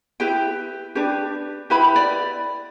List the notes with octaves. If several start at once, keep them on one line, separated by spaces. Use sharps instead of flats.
E4 G4 B4 G5
D4 G4 B4
E4 G4 B4 B5
D5